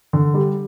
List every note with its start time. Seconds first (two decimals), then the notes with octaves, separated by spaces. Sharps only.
0.13 D3
0.34 G3